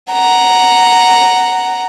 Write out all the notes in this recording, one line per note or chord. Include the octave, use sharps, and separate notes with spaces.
F#5 A#5